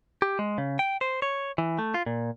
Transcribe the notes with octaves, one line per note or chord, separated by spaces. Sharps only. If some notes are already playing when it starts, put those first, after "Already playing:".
G4
G#3
C#3
G5
C5
C#5
E3
A3
F4
A#2